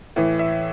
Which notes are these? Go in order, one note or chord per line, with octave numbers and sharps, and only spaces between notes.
A2 E3
E5